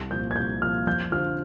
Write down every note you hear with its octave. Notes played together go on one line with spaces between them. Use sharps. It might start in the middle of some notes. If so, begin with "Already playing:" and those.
Already playing: C2
A#2 F3 G6
G#6
C2 G6
A#2 F3 F6
F2 G6
D3 F3 F6